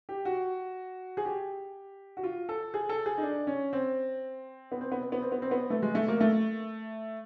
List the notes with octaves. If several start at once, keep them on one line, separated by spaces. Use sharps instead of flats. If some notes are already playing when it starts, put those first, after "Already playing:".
G4
F#4
G#4
G4
F#4
F4
A4
G#4
A4
G#4
D#4
D4
C#4
C4
B3
C4
B3
C4
B3
C4
B3
C4
B3
A3
G#3
A3
A#3
A3